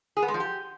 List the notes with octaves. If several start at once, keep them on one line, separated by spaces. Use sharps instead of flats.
G#4
B3
G#3
F3
G4